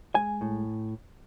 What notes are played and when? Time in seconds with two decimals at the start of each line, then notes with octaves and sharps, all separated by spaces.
0.15 G#3 G#5
0.41 A2